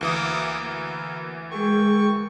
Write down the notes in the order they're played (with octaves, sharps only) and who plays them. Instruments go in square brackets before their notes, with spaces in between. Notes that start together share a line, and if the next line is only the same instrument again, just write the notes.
[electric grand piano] D2 E3 D#6 [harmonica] A#3 D6
[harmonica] A#3
[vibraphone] G#3 G#4 A#4 [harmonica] G5 C#6